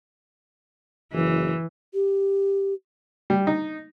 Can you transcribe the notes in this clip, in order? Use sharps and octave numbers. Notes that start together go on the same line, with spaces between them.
F#1 E3
G4
G3
D#4